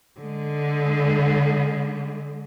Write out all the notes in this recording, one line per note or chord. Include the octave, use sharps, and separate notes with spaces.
D3 G#3